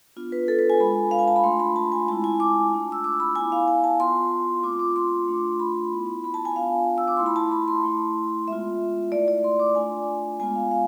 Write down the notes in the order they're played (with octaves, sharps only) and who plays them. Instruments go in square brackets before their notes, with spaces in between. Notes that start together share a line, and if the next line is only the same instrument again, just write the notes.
[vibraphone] B3 D4 F4
B4
A4
B4
G#5
G#3 D4 F4 B5
F5
G#5
A5
B5
A3 D4 F4 C6
B5
A5
G#5
G#3 C4 E4 A5
G#5
D6
A3 D4 F4
E6
D6
B5
B3 E4 G#5
F5
G#5
A5
B3 F4 C6
A3 C4 F4 D6
D6
C6
A3 D4 F4
B5
B3 E4
B5
A5
G#5
B3 D4 F4 F5
E6
D6
A3 E4 C6
B5
A5
B5
C6
A3 E4
G#3 B3 F4 E5
A3 E4 D5
D5
C6
D6
A3 D4 F4 G#5
G#3 B3 F4 G#5
F5
F5